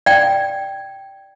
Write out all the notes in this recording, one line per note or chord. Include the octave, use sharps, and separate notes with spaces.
D5 G5